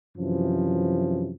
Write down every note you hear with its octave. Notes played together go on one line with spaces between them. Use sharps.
F#2 C3 E3 F3